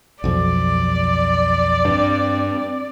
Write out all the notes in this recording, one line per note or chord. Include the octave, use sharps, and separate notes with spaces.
B1 F2 D5
G2 C4